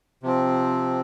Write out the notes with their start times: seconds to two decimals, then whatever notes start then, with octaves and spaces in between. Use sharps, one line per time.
0.23 C3 F3 C4